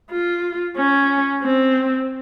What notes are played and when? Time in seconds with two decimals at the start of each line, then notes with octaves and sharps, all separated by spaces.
0.11 F4
0.77 C#4
1.43 C4